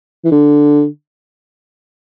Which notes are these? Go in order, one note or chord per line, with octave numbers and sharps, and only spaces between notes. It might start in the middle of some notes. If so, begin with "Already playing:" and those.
E3
D3